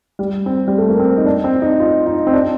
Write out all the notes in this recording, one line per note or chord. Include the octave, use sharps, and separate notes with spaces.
G3
C4
G3
A3
A#3
C4
D#4
D4
C4
D#4
F4
D#4
C4
D4